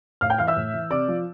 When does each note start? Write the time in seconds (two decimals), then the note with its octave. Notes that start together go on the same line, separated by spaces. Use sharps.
0.21 A2 F5 F6
0.30 G5 G6
0.38 E3 F5 F6
0.47 E5 E6
0.56 A2
0.74 E3
0.91 C3 D5 D6
1.08 F3